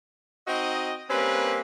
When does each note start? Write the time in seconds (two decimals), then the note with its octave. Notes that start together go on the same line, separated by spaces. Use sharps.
0.47 C4 D#4 F#4 D#5
1.10 G3 A#3 C4 C#4 B4